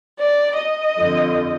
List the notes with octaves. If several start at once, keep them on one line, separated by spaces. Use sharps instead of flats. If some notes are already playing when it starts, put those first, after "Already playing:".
D5
D#5
F2 D3 F3